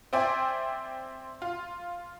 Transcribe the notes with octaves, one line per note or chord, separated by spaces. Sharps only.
C4 C5 D5 E5 G5 G#5
F4